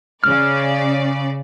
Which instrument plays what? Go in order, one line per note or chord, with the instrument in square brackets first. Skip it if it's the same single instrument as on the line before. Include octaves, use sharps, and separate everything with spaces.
[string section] C#3 D5 [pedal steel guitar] F6